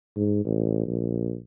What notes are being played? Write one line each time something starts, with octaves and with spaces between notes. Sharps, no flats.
G#2
A1
A#1